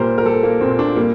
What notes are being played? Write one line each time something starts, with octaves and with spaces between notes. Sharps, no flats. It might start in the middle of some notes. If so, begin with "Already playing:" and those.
Already playing: A#2 G3 G4 A#4 C5
A#4
G3 A4
A#3
A#2 C4
D4
G3 A#3